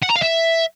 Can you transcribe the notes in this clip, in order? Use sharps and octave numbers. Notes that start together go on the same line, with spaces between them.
F#5
A#5
F5
E5